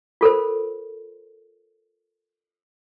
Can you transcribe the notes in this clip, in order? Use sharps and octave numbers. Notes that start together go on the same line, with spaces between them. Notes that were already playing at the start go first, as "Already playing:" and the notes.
F4 A4 A#4 C5